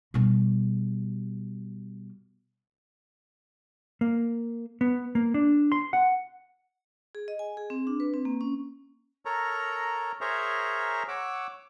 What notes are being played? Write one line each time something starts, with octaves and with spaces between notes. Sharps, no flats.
B2 G3
A#3
B3
A#3
D4
C6
F#5
G#4
D#5
G#5
G#4
C4
D4
B4
C4
A#3
C#4
A4 A#4 C#5 A#5
G#4 A#4 C5 C#5 E5 A#5
C#5 F#5 D6 E6